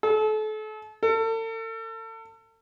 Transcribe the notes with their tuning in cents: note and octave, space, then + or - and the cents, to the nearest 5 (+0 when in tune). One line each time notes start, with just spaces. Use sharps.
A4 -35
A4 +40